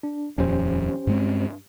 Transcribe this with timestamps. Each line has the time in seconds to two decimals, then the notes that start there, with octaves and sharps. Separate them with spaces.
0.03 D4
0.38 D#1 F2 C#4 G4 C5
1.07 G2 G#3 C4